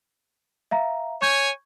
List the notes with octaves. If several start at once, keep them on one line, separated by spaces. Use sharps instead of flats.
E5 F5 A#5
C#5 G#5 C#6 G6 G#6